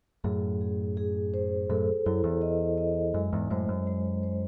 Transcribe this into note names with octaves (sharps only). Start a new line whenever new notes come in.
F#2 A2 G#4
G#4
G#4
C5
F#2 A2 A4
F#2 E4
E2
D#5
D#5
F#2 G#3
E2 G#2
F#2 A2 C5
F#2
G#3
C5